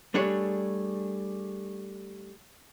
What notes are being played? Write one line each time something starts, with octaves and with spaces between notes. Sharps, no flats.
G3 A3 D4 G#4 C#5